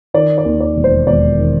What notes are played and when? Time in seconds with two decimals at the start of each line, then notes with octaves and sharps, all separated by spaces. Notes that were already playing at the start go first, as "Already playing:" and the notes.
0.14 D#3 D5
0.38 D5
0.45 D#2
0.61 D5
0.76 E1
0.84 C5
1.07 E1 D5
1.38 D#3